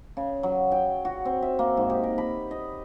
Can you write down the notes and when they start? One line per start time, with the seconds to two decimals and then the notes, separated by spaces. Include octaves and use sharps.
0.17 C#3
0.43 F#3
0.72 G5
1.05 F#4
1.25 C4
1.42 E5
1.59 A#3
1.77 G#2
1.90 G4
2.03 A#4
2.18 B5
2.51 D#5